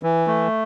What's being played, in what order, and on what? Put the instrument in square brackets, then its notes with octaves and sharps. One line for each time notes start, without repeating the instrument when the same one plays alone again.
[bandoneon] E3
A3